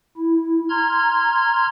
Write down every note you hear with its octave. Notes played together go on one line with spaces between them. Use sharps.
E4
A#5 C6 F6 G#6